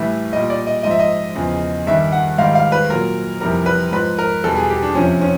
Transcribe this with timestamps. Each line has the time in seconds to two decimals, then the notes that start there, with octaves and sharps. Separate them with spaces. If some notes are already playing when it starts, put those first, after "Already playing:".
Already playing: A2 E3 G3 E5
0.33 A#2 G3 D#5
0.50 D5
0.67 D#5
0.83 G#2 F3 D#5
0.91 E5
0.99 D#5
1.35 E2 C#3 F3
1.87 G2 D#3 G3 E5
2.12 F#5
2.38 G#2 D#3 G3 F5
2.55 F5
2.72 B4
2.90 A#2 F#3 A#4
3.40 F2 C3 E3 G3 A#4
3.66 B4
3.92 G#2 F3 B4
4.18 A#4
4.44 E2 B2 G3 A4
4.56 G#4
4.70 G4
4.83 D4
4.95 F2 C3 F3 C#4
5.21 C#4